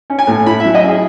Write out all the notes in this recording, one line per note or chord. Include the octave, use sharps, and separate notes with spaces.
C#4
G#5
A2
E4 B5
E5
F#3
D#5
C#4 G#4